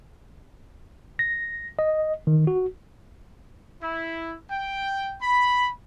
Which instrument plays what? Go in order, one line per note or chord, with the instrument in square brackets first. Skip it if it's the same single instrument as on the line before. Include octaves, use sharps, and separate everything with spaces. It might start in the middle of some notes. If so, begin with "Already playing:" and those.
[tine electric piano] A#6
D#5
D#3
F#4
[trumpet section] E4
G5
B5